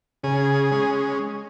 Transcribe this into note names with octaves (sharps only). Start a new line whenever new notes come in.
C#3 G#4
G#3 C#4